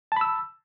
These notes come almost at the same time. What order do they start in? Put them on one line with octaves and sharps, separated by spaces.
A5 B5 E6